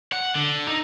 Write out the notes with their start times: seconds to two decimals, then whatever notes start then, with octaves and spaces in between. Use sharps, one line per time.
0.12 F#5
0.36 D3
0.68 D#4